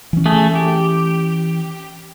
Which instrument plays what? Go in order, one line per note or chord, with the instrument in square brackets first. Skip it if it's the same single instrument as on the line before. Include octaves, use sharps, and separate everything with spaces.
[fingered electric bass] E3 C#4
[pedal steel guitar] A3 G#4
G4